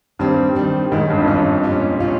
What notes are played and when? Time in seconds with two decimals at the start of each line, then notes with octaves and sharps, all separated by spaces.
0.19 G2 D#3 G3 C4
0.55 D#3 G3 C4
0.92 G#2 D#3 G#3 C#4
1.10 G2
1.19 F2
1.28 G2 D#3 G#3 C#4
1.63 A#2 G3 C#4 F4
2.00 A#2 G3 C#4 F4